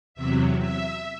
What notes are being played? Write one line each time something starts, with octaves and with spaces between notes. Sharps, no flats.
E2 C3 F#3 E5
E5